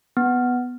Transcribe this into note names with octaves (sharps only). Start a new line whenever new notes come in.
B3